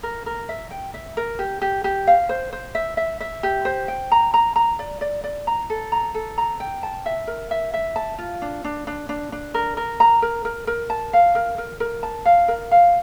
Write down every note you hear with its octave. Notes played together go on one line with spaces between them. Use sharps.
A#4
A#4
E5
G5
E5
A#4
G4
G4
G4
F5
C5
C5
E5
E5
E5
G4
C5
G5
A#5
A#5
A#5
D5
D5
D5
A#5
A4
A#5
A4
A#5
G5
A5
E5
A#4
E5
E5
A5
F4
D4
D4
D4
D4
D4
A#4
A#4
A#5
A#4
A#4
A#4
A5
F5
A#4
A#4
A#4
A5
F5
A#4
F5